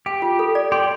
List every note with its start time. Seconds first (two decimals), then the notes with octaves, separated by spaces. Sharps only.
0.06 G4 G5
0.22 F4
0.39 A4
0.55 D5
0.72 G4 C6